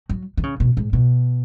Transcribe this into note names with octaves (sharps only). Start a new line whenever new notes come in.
F#3
D#3
C#3
B2
G#2
B2